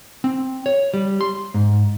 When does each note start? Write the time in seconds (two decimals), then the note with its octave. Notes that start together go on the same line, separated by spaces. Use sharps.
0.24 C4
0.66 C#5
0.94 G3
1.21 C6
1.54 G#2